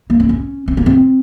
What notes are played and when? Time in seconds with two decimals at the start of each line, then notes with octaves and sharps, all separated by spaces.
0.10 A#3
0.20 C4
0.29 C#4
0.68 C4
0.77 A#3
0.86 C4